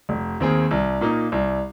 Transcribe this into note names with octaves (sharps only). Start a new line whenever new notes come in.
F1
D#2 D#3 C4 G#4
C2
A#2 A#3 D#4
C2